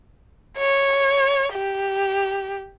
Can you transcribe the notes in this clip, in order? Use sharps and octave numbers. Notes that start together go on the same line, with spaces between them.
C#5
G4